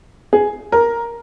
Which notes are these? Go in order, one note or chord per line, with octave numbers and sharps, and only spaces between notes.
G#4
A#4